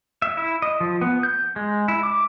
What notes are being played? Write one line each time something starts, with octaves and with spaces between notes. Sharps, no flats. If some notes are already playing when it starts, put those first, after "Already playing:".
E5
E4
D#5
F3
B3
G6
G#3
E4
D6